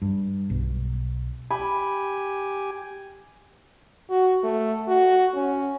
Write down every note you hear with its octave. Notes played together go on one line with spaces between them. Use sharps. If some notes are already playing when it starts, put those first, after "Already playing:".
G2
B1
G4 G#5 B5
F#4
A3
F#4
C#4